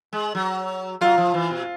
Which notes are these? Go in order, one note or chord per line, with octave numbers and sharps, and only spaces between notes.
G#3
F#3
F#3 F4
F3
E3
B2